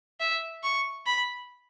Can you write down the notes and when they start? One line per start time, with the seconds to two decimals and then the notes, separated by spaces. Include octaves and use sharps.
0.20 E5
0.63 C#6
1.06 B5